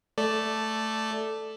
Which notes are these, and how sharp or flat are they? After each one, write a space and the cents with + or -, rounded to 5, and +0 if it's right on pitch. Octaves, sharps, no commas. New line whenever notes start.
A3 +0 A4 +0 D5 +0